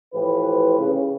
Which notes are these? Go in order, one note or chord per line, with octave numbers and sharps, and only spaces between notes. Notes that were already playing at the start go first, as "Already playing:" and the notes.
A2 E3 F3 G4 B4
C#3